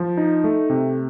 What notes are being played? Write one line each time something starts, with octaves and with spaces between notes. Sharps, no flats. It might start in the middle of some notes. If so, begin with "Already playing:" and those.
Already playing: F3
D#4
A3
C3